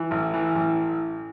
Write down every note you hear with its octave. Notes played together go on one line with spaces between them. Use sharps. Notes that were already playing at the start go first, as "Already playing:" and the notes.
Already playing: E3
A1
E3
A1